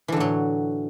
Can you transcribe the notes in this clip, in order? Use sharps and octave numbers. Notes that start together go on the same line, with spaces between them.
A2 D3 E3 F#3